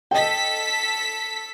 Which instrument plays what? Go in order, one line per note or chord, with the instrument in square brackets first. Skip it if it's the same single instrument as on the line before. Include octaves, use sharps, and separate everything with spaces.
[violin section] A4 B6 [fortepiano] D#5 G5